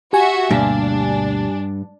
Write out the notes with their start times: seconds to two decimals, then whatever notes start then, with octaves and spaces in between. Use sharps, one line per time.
0.13 F#4 G4 E5 G#5
0.51 D2 G2 B2 A#3 D4